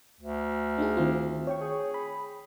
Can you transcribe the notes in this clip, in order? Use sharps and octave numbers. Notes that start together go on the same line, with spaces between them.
D2
D4 D#4 G#4
D#3 C4 F4
C#5 G5 C#6
G#4
B5